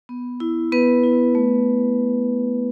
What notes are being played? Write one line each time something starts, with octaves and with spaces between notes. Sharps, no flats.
B3
E4
B3 B4
E4
A3